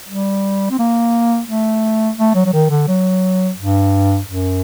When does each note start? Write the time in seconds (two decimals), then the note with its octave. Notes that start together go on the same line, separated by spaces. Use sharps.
0.08 G3
0.71 C4
0.79 A#3
1.48 A3
2.18 A3
2.35 F#3
2.46 F#3
2.53 D#3
2.70 D3
2.88 F#3
3.58 G2
4.27 F#2